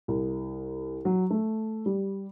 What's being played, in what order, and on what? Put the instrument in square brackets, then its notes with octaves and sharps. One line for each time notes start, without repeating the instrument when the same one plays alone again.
[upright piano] C2
F#3
A3
G3